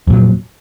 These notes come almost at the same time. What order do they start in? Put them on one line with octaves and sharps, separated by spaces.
F2 A#2 F#3